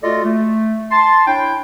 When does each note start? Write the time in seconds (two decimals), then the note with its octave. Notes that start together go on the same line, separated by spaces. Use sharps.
0.03 A3 F4 F#4 A4 D5 D#5
0.24 A3
0.91 A5 C6
1.27 D4 E4 C#5 G5